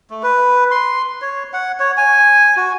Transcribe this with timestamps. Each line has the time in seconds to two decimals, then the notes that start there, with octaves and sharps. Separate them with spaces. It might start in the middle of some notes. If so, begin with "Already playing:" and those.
0.10 A3
0.23 B4
0.71 C6
1.22 C#5
1.53 F#5
1.80 C#5
1.97 G#5
2.57 F#4